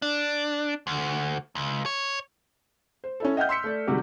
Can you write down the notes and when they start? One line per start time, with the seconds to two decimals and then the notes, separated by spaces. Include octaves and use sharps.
0.02 D4
0.87 D2
1.55 C#2
1.86 C#5
3.04 C5
3.20 C#4 E4 A4
3.37 D#5 E5 F#5 G5 F6 G6
3.49 C6 E6 B6 C#7
3.64 A3 D5
3.87 C3 D#3 G3 G#3 F#4 G4